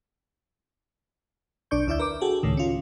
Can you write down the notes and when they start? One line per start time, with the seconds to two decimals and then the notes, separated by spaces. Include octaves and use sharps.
1.71 B1 D4 D5 C#6 G6
1.87 D2 D4 E4 D5 E5 G6
1.99 A#4 B4 D6
2.21 F#4 G#4 A4 G5
2.43 C#2 A2 D#3
2.57 C#4 F4